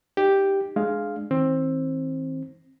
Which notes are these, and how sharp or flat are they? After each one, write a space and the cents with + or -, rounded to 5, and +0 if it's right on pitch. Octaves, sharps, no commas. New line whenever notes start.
D#4 -15 G4 +0
G#3 +15 D4 +25 F5 +0
D#3 +45 C4 +15